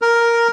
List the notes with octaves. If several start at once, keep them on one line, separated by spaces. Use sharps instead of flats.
A#4